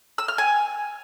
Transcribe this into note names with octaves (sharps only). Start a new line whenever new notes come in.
E6
F6
G#5